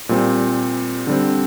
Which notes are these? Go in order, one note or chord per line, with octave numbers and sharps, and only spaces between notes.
A#2 G3 C4
D3 G3 C4